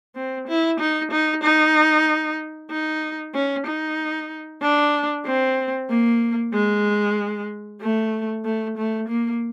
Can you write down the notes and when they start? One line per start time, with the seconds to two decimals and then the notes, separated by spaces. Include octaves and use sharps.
0.15 C4
0.48 E4
0.80 D#4
1.11 D#4
1.43 D#4
2.70 D#4
3.34 C#4
3.67 D#4
4.62 D4
5.26 C4
5.90 A#3
6.53 G#3
7.81 A3
8.45 A3
8.77 A3
9.08 A#3